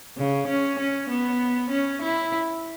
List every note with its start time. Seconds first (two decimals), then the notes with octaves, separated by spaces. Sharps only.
0.17 C#3
0.48 C#4
0.79 C#4
1.10 B3
1.71 C#4
2.02 E4